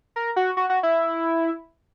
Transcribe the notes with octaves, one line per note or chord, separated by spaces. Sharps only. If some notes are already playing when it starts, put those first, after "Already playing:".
A#4
F#4
F#4
F#4
E4